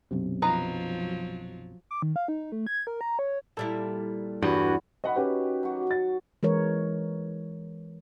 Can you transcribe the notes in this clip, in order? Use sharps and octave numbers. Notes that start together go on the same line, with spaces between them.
B1 F#2 C3
F3 F#3 D#4 B4 A#5
D6
D#3
F5
D#4
A3
G#6
A#4
A#5
C#5
A#2 G3 E4 A4
E2 G2 F#4
D#3 F#4 D#5 F#5 B5
C#4 G4 B4
F#3 F#4
A6
E3 G#3 A#4 C#5